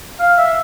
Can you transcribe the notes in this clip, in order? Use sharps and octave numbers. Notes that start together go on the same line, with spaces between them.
F5
E5